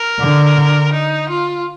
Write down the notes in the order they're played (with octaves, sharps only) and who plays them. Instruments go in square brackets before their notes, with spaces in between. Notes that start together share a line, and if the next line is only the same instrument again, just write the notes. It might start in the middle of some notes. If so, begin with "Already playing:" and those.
Already playing: [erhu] A#4
[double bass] D3
[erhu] D#4
F4